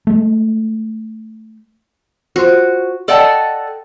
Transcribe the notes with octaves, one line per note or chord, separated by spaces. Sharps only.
G#3 A3
F4 F#4 C5 C6
A4 D5 D#5 F#5 G5 A5